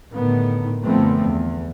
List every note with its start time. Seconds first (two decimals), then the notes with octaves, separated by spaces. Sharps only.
0.13 A2 D3 D#3 B3
0.83 F#2 D3 F3 A3 B3 C4
1.26 E2